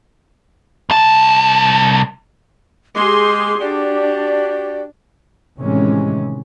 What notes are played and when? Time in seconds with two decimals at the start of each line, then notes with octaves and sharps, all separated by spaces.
0.90 C2 A5
2.95 G#3 G4 G#4 C6 D6
3.61 D4 F#4 G4 D5
5.59 A2 C3 D#3 E3 G#3 C#4